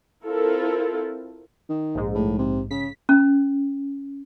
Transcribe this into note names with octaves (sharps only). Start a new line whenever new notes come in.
C4 E4 F4 A4 A#4
D#3
A#1 G#2
A2
C3
C#3 B6
C#4